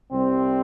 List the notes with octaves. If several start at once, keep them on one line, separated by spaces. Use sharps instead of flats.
C2 C3 G3 C4